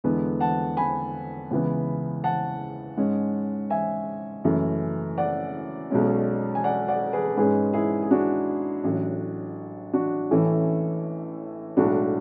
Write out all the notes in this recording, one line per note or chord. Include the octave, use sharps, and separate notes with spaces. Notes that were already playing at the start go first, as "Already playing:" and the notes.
E2 D3 G#3 B3
F#5 A5
G#5 B5
C#2 C#3 E3 B3
F#5 A5
G#2 G#3 C#4
E5 G#5
F#1 F#2 E3 A3
D5 F#5
B1 B2 G#3 C#4
G#5
D5 F#5
D5 F#5
G#4 B4
G#2 G#3 C#4 G#4 B4
E4 G#4
G#4
D4 F#4
A1 A2 F#3
D4 F#4
A1 A2 E3 A3 C#4
B1 A2 G#3 D4 F#4